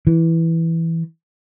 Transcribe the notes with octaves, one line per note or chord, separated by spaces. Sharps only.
E3